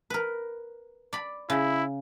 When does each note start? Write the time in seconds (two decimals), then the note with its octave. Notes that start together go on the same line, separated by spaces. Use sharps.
0.10 A#4 B4
1.13 D5 B5
1.50 C#3 E4